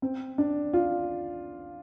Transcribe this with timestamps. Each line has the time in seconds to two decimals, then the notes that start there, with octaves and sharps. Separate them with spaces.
0.02 C4
0.38 D4
0.74 F4